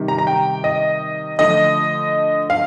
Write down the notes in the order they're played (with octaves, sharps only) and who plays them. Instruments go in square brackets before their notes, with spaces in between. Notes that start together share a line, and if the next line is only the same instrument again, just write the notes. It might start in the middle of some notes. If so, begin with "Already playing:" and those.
Already playing: [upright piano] C3 D#3 G3
A#5
A#5
G5
D#5
D3 F3 A3 D#5
F5